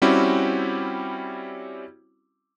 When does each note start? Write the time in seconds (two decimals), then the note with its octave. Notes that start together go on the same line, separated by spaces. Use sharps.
0.02 G3 C4 C#4 E4 F#4 G4